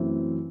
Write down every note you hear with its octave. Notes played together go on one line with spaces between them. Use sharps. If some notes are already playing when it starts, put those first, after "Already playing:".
Already playing: F#2 E3 A3 C4